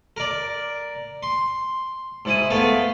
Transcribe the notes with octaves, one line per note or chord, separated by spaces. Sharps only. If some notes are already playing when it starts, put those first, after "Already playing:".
A#4 D5
C6
G#2 E4 D#6
A3 B3 F5